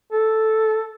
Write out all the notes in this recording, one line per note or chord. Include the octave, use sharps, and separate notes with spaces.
A4